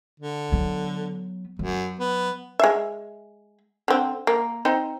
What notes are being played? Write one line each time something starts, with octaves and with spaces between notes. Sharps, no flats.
D3
F#3 B3
F#2 F#3
B3
G#3 E5
D3 C4
A#3
C4 D#4 C5